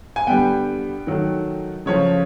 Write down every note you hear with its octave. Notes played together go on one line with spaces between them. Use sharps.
G#5
D3 G3 B3 G5
D#3 F#3 A3
C#3 F3 A3 C#5